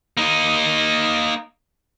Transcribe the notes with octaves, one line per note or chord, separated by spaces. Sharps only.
A#3 D#4